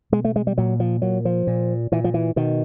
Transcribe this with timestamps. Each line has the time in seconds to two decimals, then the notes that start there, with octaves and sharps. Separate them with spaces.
0.12 B2 G#3
0.25 A3
0.36 G#3
0.47 G3
0.58 A#2 F#3
0.80 F3
1.02 A#2 F#3
1.25 F3
1.47 A#2
1.92 A#2 E3
2.04 F3
2.14 E3
2.36 B2 D#3